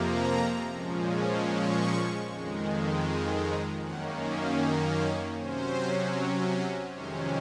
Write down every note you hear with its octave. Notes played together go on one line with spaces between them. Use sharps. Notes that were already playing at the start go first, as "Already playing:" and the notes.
Already playing: F2 C3 F3 A#3 A#5
A#2 F3 G#3 C#4
C#6
F2 D#3 G#3
C6
A#5
F#2 D#3 A#3 C#4 F#5
F5
D#5
C#5
C3 F#3 C#4 C5
F2 C3 D#3 G#3 C#4 C5